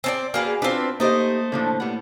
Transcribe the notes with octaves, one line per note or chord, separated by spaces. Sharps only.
C4 D4 D5
A#3 F#4 G#4 B4 D5 F5 G5
C4 D4 F4 B4
A3 A#3 D#4 G4 C5 D#5
A2 D3 F3 A#3 D4
G3 B3